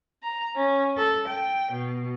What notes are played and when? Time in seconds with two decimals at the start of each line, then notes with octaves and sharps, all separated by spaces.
0.23 A#5
0.56 C#4
0.97 A4
1.27 G5
1.71 B2